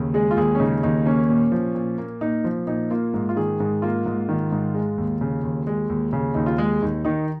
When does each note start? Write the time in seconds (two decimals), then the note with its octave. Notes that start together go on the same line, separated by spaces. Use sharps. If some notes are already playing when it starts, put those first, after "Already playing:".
Already playing: D#2 C#3
0.14 G#3 G#4
0.31 F4
0.37 D#2 G#4
0.55 C#4
0.60 C#3 D#4
0.83 D#2 D#4
1.06 A#3 C#4
1.29 A#2
1.52 F3
1.75 A#2
1.98 A#3
2.21 A#2 D#4
2.44 F3
2.67 A#2 D#4
2.91 A#3 F4
3.14 G#2
3.29 F4
3.36 D#3 G#4
3.60 G#2
3.82 A#3 F4
4.06 G#2
4.29 D#3
4.52 G#2
4.74 G#3
4.98 D#2
5.21 C#3
5.43 D#2
5.67 G#3
5.89 D#2
6.13 C#3
6.35 D#2 D#4
6.46 F4
6.58 G#3 G#4
6.82 D#2 D#4
7.05 D#3 D#4